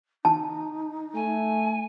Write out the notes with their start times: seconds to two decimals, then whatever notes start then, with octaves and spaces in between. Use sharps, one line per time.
0.25 D#4 A5
1.15 A3 G#5